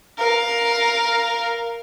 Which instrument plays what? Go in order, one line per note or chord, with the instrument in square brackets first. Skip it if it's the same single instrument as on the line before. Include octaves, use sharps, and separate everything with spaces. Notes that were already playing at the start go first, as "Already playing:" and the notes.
[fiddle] A#4 F5